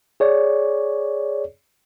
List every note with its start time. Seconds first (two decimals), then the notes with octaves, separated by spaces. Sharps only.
0.20 G#4 C#5 D5